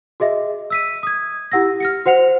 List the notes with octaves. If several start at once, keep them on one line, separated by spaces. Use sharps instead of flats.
F#4 G#4 D#5 E5
E6 B6 D#7
D#6 G#6
E4 G4 F#5 E6 A#6
F6 A#6 C#7
F#4 C5 F#5 C#7 F7